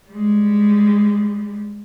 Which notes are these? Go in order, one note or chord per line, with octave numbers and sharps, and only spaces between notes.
G3 G#3